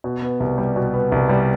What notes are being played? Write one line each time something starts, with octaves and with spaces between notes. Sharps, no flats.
B2
B3
C2
G3
B2
B3
C2
G3